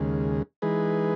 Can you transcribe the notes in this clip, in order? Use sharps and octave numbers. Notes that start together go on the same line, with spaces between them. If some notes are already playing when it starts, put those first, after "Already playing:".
Already playing: D#2 C#3 G#3
E3 G#3 D#4 G#4 B4